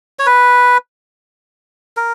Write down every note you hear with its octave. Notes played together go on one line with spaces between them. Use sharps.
C#5
B4
A#4